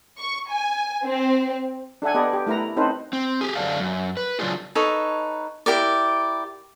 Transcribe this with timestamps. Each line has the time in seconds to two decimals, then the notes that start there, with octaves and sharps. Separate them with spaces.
0.18 C#6
0.50 G#5
1.05 C4
2.02 D4 A4 E5 F#5 G#5
2.15 B3 G4 A4 B4 D5 D#5
2.33 G4
2.47 A3 E4 A#4 B4 A#5
2.76 C4 C#4 D#4 A4 B4 C5
3.13 C4
3.41 G4 G#4
3.56 F#2 D3 D4 F5
3.80 F#2
4.17 B4
4.39 C#3 F#3 D4 F4 G#4
4.75 D#4 A4 B4 C#5
5.66 E4 G4 A#4 D5